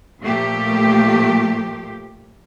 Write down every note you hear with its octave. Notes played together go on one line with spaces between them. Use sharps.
A#2 F3 A3 A#3 G4